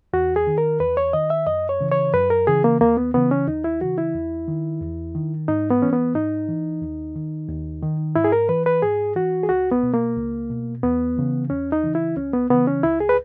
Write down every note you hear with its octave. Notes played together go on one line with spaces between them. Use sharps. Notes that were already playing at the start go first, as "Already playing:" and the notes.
E2 F#4
G#4
D#3
A#4
E2 B4
C#5
D#3 D#5
E5
F#2 D#5
C#5
C#3 E3
C#5
F#2 B4
A#4
C#3 E3 G#4
A#3
D#2 A#3
B3
C#3 E3 B3
C#4
D#2 D#4
E4
C#3 E3 F#4
E4
E2
D#3
E2
D#3
G#2 D#4
B3
E3 C#4
B3
G#2 D#4
E3
D#2
D#3
D#2
D#3
G#2 E4
G#4
A#4
E3 B4
B4
G#2 G#4
E3 F#4
G#4
C#2 F#4
B3
B2
A#3
C#2
B2
E2 B3
C#3 E3
E2 C#4
D#4
C#3 E3
E4
C#2 C#4
B3
C#3 E3 B3
C#4
C#2 E4
G#4
B4